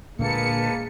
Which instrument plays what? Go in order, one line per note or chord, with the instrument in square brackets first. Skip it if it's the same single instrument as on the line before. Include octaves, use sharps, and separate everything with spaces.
[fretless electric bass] A#2 D3 [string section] G#3 C#7 [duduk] A#3 [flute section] A#4 B4 A5